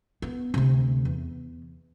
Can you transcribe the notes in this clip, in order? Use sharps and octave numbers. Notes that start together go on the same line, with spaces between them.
B3
D2 C3
E2